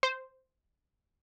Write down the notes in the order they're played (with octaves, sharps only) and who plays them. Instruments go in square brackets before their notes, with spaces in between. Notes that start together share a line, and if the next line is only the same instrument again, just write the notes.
[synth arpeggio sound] C5